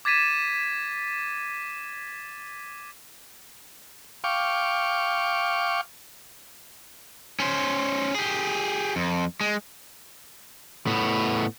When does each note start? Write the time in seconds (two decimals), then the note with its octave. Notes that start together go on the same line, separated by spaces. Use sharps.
0.05 D6 G#6 A6 B6 D#7 E7
4.24 F5 G5 C#6 D6
7.40 C#4 C5
8.15 G4 G#4
8.96 F2
9.41 G#3
10.87 A2 B3